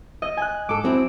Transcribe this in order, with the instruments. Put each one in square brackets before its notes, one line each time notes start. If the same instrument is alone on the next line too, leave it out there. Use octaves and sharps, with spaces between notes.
[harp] D#5
G#5 F#6
[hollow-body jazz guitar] G#2 A4 [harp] D6
[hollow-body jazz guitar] F#3 C4 E4